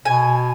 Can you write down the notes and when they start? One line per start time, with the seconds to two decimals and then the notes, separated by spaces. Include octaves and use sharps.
0.05 B2 G#5